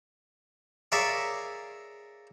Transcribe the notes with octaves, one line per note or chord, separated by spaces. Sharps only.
G#4 A#4 C#5 D5 E5 F5